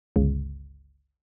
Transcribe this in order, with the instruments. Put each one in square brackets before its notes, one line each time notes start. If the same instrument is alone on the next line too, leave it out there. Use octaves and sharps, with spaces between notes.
[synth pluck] G1 C#2 C#3